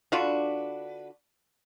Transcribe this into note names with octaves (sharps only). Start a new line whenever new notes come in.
D3 D4 F4 F#4 B4